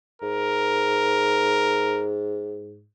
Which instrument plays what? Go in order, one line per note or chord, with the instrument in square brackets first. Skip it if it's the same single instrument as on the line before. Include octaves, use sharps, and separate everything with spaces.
[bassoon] G#2 [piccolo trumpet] A#4